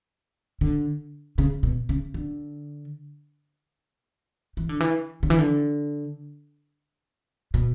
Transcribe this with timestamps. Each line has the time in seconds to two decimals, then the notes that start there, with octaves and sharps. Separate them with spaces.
0.61 D3
1.38 C#3
1.63 B2
1.89 C#3
2.14 D3
4.57 E3
4.69 D3
4.80 E3
5.23 D3
5.30 E3
5.38 D3
7.54 B2